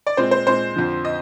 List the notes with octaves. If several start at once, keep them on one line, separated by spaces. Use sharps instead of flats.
D5
A#2 G#3 C4 C5
C5
A#2 G#3 C4 C5
F2 D3 F3
D#5